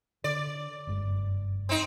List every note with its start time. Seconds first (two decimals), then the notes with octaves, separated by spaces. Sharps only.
0.24 D3 D5
0.87 F#1 G2 G#3
1.69 C4 D#4